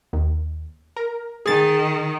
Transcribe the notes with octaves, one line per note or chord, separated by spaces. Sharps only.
D#2
A#4
D#3 G#4 A6